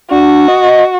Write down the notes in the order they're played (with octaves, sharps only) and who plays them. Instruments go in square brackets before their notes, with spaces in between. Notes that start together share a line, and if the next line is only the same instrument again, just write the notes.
[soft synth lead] D4 [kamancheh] F#4
[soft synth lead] D#5